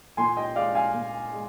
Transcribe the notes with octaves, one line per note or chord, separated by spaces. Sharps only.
A#2 G#5 C6
D#5 G5
G#3 D5 F5
F5 G#5
A#2
G#3